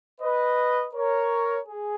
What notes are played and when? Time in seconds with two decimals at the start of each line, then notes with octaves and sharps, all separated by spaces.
0.20 B4 D#5
0.94 A#4 C#5
1.67 G#4